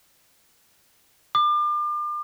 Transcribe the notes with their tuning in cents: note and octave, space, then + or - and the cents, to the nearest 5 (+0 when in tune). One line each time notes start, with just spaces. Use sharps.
D6 +35